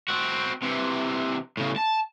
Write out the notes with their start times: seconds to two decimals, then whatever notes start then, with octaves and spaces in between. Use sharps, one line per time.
0.08 C4 F#4
0.62 C3 E3
1.57 A2 C#3
1.76 A5